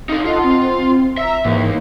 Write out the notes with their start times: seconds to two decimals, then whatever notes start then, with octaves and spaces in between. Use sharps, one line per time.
0.09 D#4 A4 F5
0.25 F4 A4 D#5 F#5
0.44 C4
1.17 E5 A#5 E6
1.44 D#2 G#2 E3 A#3